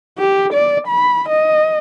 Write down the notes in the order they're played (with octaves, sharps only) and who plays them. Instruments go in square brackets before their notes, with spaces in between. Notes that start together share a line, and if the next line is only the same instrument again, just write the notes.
[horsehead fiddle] G4
D5
B5
D#5